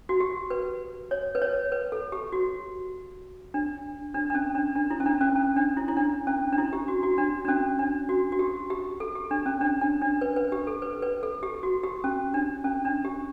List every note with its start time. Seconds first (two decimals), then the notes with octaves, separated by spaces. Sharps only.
0.09 F#4
0.20 G4
0.50 B4
1.11 C#5
1.35 B4
1.42 C#5
1.72 B4
1.92 A4
2.12 G4
2.32 F#4
3.54 D4
4.14 D4
4.30 D4
4.35 C#4
4.55 D4
4.76 D4
4.91 E4
5.00 C#4
5.06 D4
5.21 C#4
5.36 C#4
5.56 D4
5.77 E4
5.88 E4
5.97 D4
6.27 C#4
6.52 D4
6.58 E4
6.73 G4
6.88 F#4
7.03 F#4
7.18 D4
7.45 D4
7.48 C#4
7.79 D4
8.09 F#4
8.32 F#4
8.39 G4
8.70 G4
9.00 A4
9.15 G4
9.31 D4
9.46 C#4
9.61 D4
9.81 D4
10.01 D4
10.21 B4
10.36 B4
10.52 G4
10.67 A4
10.82 B4
11.02 B4
11.23 A4
11.43 G4
11.63 F#4
11.83 G4
12.04 C#4
12.34 D4
12.64 C#4
12.85 D4
13.05 G4